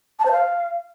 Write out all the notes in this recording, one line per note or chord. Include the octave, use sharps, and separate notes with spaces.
A5
C5
F5